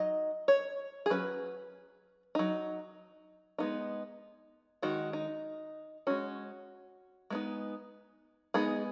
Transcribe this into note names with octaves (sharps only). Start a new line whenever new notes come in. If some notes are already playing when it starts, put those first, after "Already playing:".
Already playing: F#3 D#4 D#5
C#5
G#4
F#3 C#4 B4
F#3 D#4
G#3 B3 D#4
D#3 G#3 D#4 F#4
D#4
G#3 C#4 F#4
G#3 B3 D#4
G#3 B3 D#4 G#4